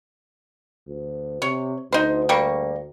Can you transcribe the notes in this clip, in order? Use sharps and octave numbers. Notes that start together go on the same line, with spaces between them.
D2
C3 C#5
D2 D#4 C5
G3 A#3 C#6